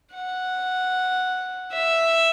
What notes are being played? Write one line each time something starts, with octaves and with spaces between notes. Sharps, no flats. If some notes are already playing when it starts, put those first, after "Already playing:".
F#5
E5